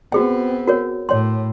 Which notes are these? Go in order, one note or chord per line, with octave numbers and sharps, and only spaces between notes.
B3 C4 F#4 G#4 G5
F#4 A#4 C#5
A2 C#5 G5 C6